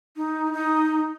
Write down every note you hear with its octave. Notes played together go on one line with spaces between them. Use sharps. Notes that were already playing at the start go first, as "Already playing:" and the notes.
D#4
D#4